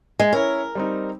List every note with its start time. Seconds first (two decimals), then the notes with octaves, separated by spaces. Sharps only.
0.20 G#3
0.33 C#4 E4 A#4 C#5
0.75 G3 C4 D#4